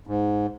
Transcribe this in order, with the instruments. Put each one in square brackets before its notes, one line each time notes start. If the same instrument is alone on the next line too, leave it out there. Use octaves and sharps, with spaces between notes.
[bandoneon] G#2